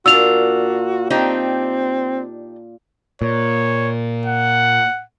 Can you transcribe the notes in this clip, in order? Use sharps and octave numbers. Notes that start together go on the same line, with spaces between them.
A#2 D4 F4 F#4 E6 F7
C4 D4 D#4 G4
A#2 C#5
F#5